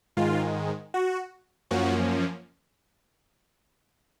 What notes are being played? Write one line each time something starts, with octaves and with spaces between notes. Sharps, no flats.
G#2 D#3 G#3 F4
F#4
F#2 F3 A#3 C#4 F#4